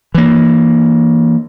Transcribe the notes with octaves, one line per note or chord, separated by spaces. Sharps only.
E3 A#3